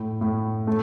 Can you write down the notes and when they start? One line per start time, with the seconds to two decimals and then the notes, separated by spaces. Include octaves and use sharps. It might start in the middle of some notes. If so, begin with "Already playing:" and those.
Already playing: A2
0.21 A2
0.67 A3